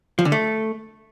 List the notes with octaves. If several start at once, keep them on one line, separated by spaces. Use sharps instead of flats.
F3
D3
A3